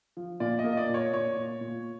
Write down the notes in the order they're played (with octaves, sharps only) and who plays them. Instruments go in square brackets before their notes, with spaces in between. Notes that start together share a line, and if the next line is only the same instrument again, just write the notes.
[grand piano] F3
[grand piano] A#2 [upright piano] D5
[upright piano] D#5
[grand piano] A#3
[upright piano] D#5
D5
[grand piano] A#2
[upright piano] C#5
[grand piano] A#2 [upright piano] C#5
[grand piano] A#2
A#2